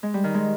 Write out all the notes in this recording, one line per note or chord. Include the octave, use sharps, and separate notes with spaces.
G#3
G3
D#3
G#3